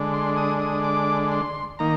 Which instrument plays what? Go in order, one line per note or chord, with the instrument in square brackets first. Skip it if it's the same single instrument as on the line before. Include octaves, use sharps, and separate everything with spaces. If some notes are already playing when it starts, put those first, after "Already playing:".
Already playing: [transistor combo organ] D3 G#3 D4
C6
D#6
D#6
D6
C6
D#3 A#3 D#4 A#5